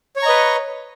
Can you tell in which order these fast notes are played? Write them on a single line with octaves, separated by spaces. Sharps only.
C#5 C#6 A#5 D#5 B4